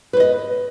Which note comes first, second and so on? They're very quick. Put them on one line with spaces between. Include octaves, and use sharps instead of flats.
B4 C5 D#5